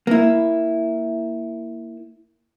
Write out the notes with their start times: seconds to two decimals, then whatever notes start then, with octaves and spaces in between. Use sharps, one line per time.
0.07 A#3 E4